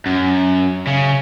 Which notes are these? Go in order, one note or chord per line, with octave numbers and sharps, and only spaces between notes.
F#2
C#3